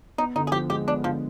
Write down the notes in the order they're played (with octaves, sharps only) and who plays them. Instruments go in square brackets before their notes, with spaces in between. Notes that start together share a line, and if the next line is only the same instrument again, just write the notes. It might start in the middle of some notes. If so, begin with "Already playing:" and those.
[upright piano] B3 [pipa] D#4
[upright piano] D3 [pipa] D#4
[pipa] G#4
[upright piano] F3 [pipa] G4
[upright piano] G#3 [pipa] G4
[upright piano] B3 [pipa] D4
[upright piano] D3 [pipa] F3